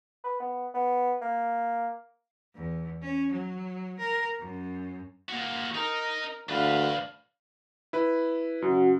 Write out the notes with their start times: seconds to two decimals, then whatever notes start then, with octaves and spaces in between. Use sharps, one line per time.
0.24 B4
0.40 B3
0.74 B3
1.21 A#3
2.55 E2
3.02 C#4
3.32 F#3
3.99 A#4
4.39 F#2
5.29 A#3 F#4
5.75 D#4 A#4
6.49 D2 D4 B4 F5
7.93 E4 B4
8.62 F#2 C#3 F#4